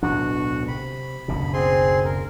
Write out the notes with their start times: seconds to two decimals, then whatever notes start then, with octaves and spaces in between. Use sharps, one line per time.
0.03 D1 B1 D4 F#4 F#5
0.68 C3 B5
1.28 F#1 D2 B2
1.53 C4 G#4 C6
2.04 A#4